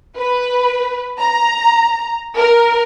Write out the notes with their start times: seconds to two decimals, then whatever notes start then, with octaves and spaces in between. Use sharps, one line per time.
0.18 B4
1.19 A#5
2.38 A#4